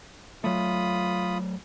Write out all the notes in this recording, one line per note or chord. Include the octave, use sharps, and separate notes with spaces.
F#3 A3 F4 B5 D#6